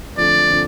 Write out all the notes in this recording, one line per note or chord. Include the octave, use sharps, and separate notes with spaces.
D3 F3 A3 C4 D5
D3 F3 A3 C4